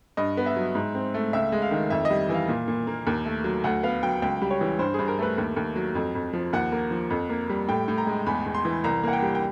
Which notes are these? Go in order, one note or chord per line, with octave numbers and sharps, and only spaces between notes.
G2 D#5
B3
E5
F#3
G#2
C4
A3
C#2 E5
G#3
F5
D#3
F2 E5
D#5
G3
E3
F5
A#2
A#2
A#3
D#2
A3
F#3
D2 F#5
B3 F5
F#3 G5
C#2 G5
G3
C#5
E3
G2 C5
G2 G#4
A#4
A3 B4
D#2
D#2
F#3
F2
F2
F3
D#2 F#5
A#3
F3
F2
A#3
G3
A2 G5
A2
A#5
G#3
E2 B5
E2
C6
E3
C2 A#5
A#3 F#5
G5
G3
G5